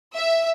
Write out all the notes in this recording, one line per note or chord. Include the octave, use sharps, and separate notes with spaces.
E5